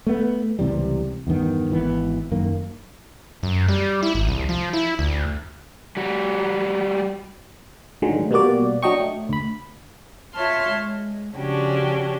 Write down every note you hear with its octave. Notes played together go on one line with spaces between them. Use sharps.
A3 B3
C#2 C3 E3 G3
E2 G2 D#3 B3
G#1 E3 B3
F#2 D#3 A#3
F#2
G3
E4
G#1
C2
F3
E4
D2
G3 F#4
A2 D3 D#3 F#3 G#3
B2 G3 A#3 F#4 D5
F#3 D4 D#5 G5 C#6
A3
D2 B5
F4 C#5 E5 A5 C6 F6
G#3
C#3 F3 C#4 D4 F#4 G4